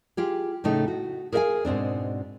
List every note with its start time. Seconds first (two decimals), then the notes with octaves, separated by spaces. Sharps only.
0.17 F4 G4 G#4
0.64 A2 C#3 A3 D#4
0.88 F#4
1.32 G#4 A#4 C5 E5 F5 G#5
1.65 G#2 B2 C4 D4